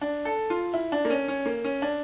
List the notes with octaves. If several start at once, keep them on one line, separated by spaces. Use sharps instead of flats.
D4
A4
F4
E4
D4
A#3
C#4
C#4
A#3
C#4
D4